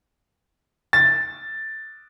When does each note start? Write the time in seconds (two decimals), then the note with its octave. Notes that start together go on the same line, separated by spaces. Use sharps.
0.93 A6